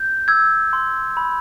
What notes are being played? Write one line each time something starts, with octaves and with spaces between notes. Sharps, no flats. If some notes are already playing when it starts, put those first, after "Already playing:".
Already playing: G6
E6 G#6
C6
B5